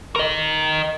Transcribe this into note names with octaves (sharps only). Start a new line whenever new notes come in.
A#4 D#5